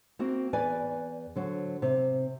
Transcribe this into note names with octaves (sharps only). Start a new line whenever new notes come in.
A#3 C4 F#4
E2 B4 D5 G#5
D3 F#3 C5
C3